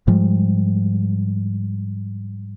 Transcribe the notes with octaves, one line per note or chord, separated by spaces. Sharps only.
G#2 F3 G3 G#3